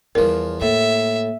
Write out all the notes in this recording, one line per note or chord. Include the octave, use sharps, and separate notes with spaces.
E2 F3 G3 E4 A#4
A2 A#3 E5